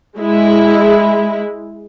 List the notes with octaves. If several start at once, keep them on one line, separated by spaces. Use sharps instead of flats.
G#3 E4